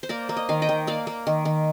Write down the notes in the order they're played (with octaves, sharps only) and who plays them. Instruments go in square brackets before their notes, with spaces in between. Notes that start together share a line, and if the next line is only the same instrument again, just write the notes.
[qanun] C5
A#3 A#4 D5
A#3
D#5
D#3 F5
D#5 G5
D#3
A#3 D5 F5
A#3
D#3
D#3